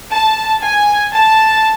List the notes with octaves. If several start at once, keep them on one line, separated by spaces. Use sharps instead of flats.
A5
G#5
A5